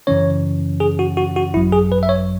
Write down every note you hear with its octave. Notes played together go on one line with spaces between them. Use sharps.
F#2 C#3 E3 C#4 C#5
G#4
F#4
F#4
F#4
G#1 F#2 F#3 E4
G#4
B4
E5
C#5